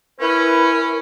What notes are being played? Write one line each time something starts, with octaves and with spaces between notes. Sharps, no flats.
C#4 E4 A#4 B4